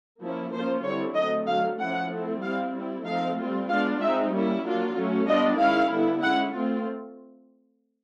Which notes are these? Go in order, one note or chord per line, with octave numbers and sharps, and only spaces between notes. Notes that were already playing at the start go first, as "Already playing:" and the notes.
F3 A#3 C#4 E4
F3 A#3 C#4 F4 C5
D3 G3 C4 E4 C#5
D3 F#3 A3 C4 D#5
D3 F#3 A3 F5
F3 A3 C#4 E4 F#5
A3 C4 E4
G3 C4 E4 F5
G3 C4 E4
F3 A3 C4 D#4 F5
G3 C4 F4
G#3 B3 D4 F4 F5
G#3 C4 D#4 E5
G3 A#3 C#4 E4
F#3 A#3 D4 F4
F#3 A3 C#4
G3 B3 D4 F4 D#5
D#3 G#3 C#4 E4 F5
D3 G3 B3 E4
G#3 C#4 E4 F#5
A3 C4 F4